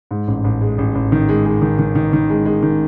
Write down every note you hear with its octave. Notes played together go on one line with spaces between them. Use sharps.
G#2
A1
A1
G#3
A1
A1
D#3
G#3
G#3
D#3
D#3
D#3
D#3
G#3
G#3
D#3